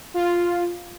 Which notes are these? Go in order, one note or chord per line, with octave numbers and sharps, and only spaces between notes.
F4